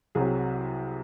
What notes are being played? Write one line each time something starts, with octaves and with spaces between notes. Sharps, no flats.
C2 C3 F#3 G#4